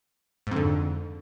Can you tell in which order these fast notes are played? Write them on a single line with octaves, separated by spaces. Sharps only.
G#2 F2 D3